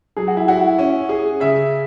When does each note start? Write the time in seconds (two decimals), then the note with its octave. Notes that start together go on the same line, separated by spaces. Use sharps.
0.17 F#3 G#4
0.28 F#4
0.37 E4
0.48 E4 F#4
0.79 C#4
1.09 G#4
1.40 C#3 E5